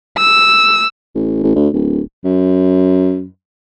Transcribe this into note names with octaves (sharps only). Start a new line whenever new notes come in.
E6
A1
A1
D2
D1
F#2